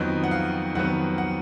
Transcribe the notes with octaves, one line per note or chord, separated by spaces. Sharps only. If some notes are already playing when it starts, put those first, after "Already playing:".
Already playing: F2 D#3 F#3 B3 D#5
F#5
F5
F2 D#3 F#3 B3 F#5
F#5